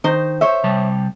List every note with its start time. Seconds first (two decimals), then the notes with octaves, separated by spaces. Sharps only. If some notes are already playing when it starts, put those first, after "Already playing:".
0.04 D#3 D#4 C5
0.41 C5 C#5 E5
0.63 C3 G3 A5